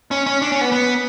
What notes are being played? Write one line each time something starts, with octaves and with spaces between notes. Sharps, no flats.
C#4
C#4
D4
C#4
B3
B3